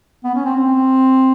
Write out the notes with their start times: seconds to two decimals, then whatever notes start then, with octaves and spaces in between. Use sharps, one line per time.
0.24 B3
0.35 C#4
0.45 C4
0.56 C4